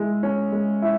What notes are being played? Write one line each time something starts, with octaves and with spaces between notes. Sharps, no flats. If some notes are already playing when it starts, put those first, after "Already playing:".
Already playing: G#3 E4
C#4
G#3
E4